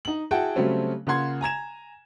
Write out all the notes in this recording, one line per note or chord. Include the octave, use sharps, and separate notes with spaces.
D#4 F#7
E4 F#4 G#4 F#5 G5 A5
C#3 F#3 G3 A3 C4 C#4
C#3 A#3 F4 F#5 C6 G#6
G#5 A#5 G#6 E7